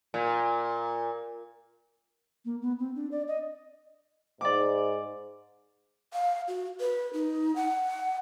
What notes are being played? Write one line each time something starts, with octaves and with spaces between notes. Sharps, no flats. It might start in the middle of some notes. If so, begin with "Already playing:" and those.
A#2
A#3
B3
C4
D4
D5
D#5
G#2 D5 D6
F5
F#4
B4
D#4
F#5